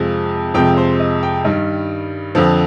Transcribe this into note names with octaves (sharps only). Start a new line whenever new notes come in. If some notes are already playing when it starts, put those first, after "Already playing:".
Already playing: F2 C3 F3 G#3
F2 C3 F3 G#3 G5
C5
D#5
G5
G2 D#3 G3 D#5
F2 D3 F3